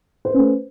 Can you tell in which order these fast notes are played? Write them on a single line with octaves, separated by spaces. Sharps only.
C5 B4 C#4 A3